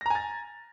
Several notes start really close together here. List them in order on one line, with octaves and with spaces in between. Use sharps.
A#6 A#5 G#5 A6